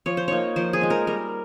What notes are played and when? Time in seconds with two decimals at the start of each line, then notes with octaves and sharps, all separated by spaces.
0.06 F3 C#5
0.17 C5
0.28 A#3 D#4 C#5
0.56 F3 C5
0.73 G#4
0.81 G#3 D#4
0.90 A#4
1.07 G3 A#4